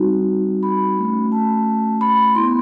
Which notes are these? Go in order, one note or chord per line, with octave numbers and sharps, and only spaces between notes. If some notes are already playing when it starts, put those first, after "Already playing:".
Already playing: G3 C4 D#4 F#4
B5
A3 C#4 F#4
A5
B5
B3 E4 C6